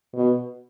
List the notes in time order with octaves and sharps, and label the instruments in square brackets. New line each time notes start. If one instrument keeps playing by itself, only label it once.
[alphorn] B2